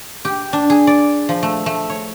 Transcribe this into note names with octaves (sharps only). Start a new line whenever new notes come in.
G4
D4
G#4
D5
F3
A3
A3
C#5